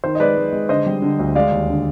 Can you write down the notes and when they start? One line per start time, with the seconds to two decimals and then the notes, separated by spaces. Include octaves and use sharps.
0.04 D#3 C5
0.15 D#5
0.20 G#3 B4 D5
0.37 G#3
0.53 G#3
0.69 D3 C5 D#5
0.86 G3
1.02 D3
1.19 D2
1.35 G#3 D5 F5
1.52 D#2
1.69 D3